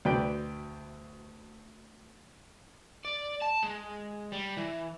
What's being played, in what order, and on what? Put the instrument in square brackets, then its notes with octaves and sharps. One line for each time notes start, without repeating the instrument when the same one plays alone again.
[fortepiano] D2 B2 B4 D5 G5
[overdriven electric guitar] D5
A5
G#3
G3
E3